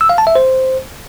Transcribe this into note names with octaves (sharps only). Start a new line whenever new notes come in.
E6
F5
A5
E5
C5